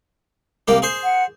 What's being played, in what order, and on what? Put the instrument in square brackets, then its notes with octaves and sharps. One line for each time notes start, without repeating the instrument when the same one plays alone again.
[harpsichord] C2 A#3 G4
G#4 C5
[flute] F#5